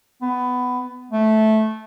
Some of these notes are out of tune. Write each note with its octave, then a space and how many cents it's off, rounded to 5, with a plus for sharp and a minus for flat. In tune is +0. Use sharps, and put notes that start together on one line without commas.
B3 +15
A3 -10